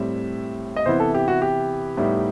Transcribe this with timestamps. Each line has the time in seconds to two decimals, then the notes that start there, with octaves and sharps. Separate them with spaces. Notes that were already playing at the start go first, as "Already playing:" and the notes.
Already playing: A2 G3 C4 E5
0.76 D#5
0.86 C3 E3 B3 E4 C5
1.00 A4
1.14 G4
1.28 F#4
1.42 G4
1.97 A2 G3 B3 D#4